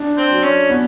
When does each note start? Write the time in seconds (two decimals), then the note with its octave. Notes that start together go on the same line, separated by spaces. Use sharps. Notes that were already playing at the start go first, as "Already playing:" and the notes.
Already playing: D4
0.17 C4
0.31 F#3
0.43 C#4
0.70 B3